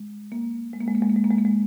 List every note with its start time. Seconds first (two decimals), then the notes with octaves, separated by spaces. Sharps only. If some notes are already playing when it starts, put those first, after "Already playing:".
Already playing: G#3
0.32 A#3
0.73 G#3
0.81 A#3
0.88 G#3
0.95 A#3
1.02 G#3
1.09 A#3
1.16 G#3
1.24 A#3
1.31 G#3
1.38 A#3
1.45 G#3